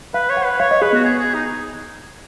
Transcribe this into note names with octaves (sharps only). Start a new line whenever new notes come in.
B4 F5
C#5
F#5
B4
C#5 F5
D#5
G#4 B4
B3 F#4
G#4
G#4
D#4